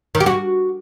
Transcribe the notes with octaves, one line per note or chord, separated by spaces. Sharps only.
D#3
G4
F#4